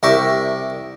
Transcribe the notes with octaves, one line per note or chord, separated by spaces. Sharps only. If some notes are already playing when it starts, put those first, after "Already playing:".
C2 G4 A#4 E5 C#6